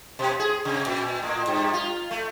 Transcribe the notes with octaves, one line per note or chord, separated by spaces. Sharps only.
B2
G#4
C3
A#2
A2
G2
F4
A3